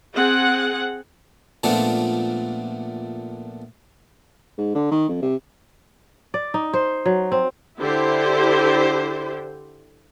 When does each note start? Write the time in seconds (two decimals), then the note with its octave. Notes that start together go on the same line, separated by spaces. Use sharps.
0.15 C4 G#4 F#5
1.63 A#2 F3 A3 B3 C4 D4
4.58 G#2
4.75 D3
4.91 D#3
5.08 F2
5.22 C3
6.34 D5
6.54 D#4
6.73 C5
7.06 F#3
7.32 C4
7.78 D3 E4 G4 C5